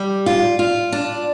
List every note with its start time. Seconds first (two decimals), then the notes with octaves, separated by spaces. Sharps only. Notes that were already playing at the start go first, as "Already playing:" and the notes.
Already playing: G3
0.26 F4
0.59 F4
0.92 D4